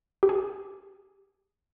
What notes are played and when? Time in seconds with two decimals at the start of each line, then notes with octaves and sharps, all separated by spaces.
0.23 G4
0.29 G#4